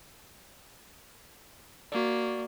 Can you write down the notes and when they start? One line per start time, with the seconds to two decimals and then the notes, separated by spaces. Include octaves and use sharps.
1.92 A#3 F#4 D5